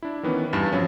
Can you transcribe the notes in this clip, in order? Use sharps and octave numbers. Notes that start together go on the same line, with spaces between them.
D4 E4
D#3 E3 B3 C#4
E2 G2 A6 E7
F3 F#3 C#4